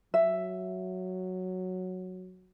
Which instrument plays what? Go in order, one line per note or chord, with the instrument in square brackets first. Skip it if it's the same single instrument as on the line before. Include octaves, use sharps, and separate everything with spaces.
[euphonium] F#3 [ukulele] E5